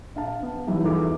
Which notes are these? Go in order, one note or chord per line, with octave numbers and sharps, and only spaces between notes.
A#1 F5 A5
B3
E3 F#3 G3 D#4 E5
E2 D#4 F4 A4 D6